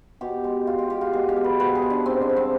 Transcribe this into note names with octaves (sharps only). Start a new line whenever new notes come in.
B2 G4
G#3
B2 F4
G4
G#3 G4
F4
B2 G#4
G4
G#3
B4
B2 B4
G#4
G#3
D4
G#2 C4
D4
G3
C4